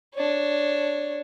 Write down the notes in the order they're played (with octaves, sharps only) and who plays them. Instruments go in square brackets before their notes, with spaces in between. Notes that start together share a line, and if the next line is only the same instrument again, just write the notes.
[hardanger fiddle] D4 C#5